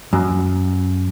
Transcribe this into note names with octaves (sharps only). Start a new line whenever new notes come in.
F#2